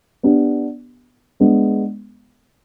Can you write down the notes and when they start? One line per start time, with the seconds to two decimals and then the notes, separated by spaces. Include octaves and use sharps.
0.23 B3 D4 G4
1.40 G#3 B3 D4